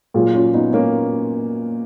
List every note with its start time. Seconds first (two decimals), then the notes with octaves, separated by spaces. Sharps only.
0.14 A#2 F#3 F4 G#4
0.34 C#4 F4
0.54 B3 D#4
0.73 A#3 C#4